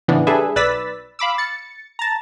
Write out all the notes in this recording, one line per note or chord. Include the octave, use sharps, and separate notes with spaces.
A2 C#3 E3 B3 D4
G3 D4 G#4 A4 B4 E5
B1 B4 D5 E6 A6 B6
F5 B5 D6 E6
A6 C#7
A5 A#5